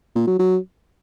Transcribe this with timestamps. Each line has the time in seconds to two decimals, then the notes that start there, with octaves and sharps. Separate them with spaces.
0.15 A#2
0.27 F#3
0.39 F#3